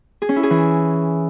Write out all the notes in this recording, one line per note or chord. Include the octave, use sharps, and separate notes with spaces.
G#4
C#4
E4
G#4
E3